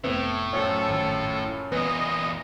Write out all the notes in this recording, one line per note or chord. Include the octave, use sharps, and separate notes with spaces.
F1 A2 B3 C4 A4 E5
F#2 F3 C#4 A4
G#1
E2 A#2 B3 D#5